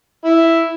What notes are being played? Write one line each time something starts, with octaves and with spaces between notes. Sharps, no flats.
E4